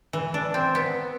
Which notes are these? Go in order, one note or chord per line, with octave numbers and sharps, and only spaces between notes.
E3
D4
C4
B3